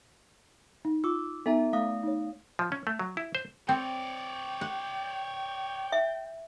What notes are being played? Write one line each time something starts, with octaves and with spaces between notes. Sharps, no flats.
D#4
F4 D6 E6
B3 D#4 A4 E5 A#5
A3 F5 D#6
D#4 C#5
F3
C#4
A3
F#3
E4
C5
C4 C#5 D5 G5
F#5
E5